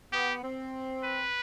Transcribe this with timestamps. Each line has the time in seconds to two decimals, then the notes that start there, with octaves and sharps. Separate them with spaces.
0.12 B3 G4
0.43 C4
1.04 B4